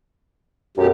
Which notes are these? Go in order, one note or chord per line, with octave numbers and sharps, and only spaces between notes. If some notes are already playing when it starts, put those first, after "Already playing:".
F#2 B2 A3 G4